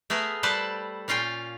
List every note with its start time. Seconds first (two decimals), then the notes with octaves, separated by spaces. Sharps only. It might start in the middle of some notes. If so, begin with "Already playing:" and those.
0.10 A3 B3 G#4 A#4
0.43 G3 A4 B4 C5 D5 A5
1.08 A#2 C#4 F4 F5 G5